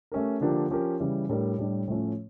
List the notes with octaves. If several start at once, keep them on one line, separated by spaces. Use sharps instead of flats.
A3 C#4 G4 A#4
D3 F3 A#3 D4 G4
F3 C#4 G4 A#4
C#3 E3 G3
A2 G3 D4 G4 A#4
A2 G3 D4 G4
A2 F3 A3 C#4